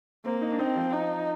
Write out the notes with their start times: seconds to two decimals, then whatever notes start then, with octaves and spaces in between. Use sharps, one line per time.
0.25 A#3 C4
0.41 D#4
0.51 D4
0.59 C4 D#4
0.76 F3
0.93 D#4